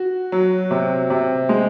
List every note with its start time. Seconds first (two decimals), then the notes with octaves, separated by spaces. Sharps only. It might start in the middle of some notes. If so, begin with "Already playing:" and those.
Already playing: F#4
0.32 F#3
0.71 C3
1.10 C3
1.49 G#3